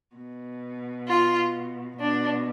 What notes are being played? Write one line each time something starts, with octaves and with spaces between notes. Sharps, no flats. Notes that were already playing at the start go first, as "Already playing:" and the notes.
B2
F4
B2 D4